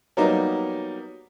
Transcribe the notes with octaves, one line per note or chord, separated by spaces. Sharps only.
F#3 G3 A#3 B3 D#4